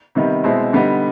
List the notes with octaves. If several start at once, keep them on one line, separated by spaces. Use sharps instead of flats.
C3 D#3 G3 B3 D#4
B2 G#3 C4 E4
D3 G3 B3 D#4